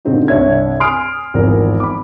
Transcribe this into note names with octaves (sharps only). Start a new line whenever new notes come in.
A#2 D3 G#3 C4 D#4 F#4
C2 G2 C#5 E5 G#6
G#5 C6 D#6 F6 C7 D7
G#1 E2 F3 A#4
B5 D6